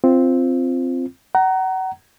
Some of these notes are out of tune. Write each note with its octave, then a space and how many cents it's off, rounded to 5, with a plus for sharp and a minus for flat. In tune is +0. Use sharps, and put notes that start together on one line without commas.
C4 +0 F4 -10
F#5 +30 A#5 +0